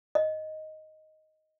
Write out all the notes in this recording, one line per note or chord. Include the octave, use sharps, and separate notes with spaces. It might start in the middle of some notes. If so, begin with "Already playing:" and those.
D#5